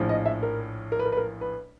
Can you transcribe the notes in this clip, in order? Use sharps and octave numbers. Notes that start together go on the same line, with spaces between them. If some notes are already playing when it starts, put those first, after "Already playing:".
Already playing: A#1 A2 F3
D#5
E5
A#4
A#4
B4
A#4
B4
A#4
B4